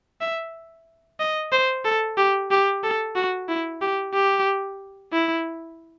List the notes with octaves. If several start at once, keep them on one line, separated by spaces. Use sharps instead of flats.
E5
D#5
C5
A4
G4
G4
A4
F#4
E4
G4
G4
E4